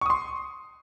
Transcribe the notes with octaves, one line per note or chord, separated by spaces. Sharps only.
C6 C#6 D#6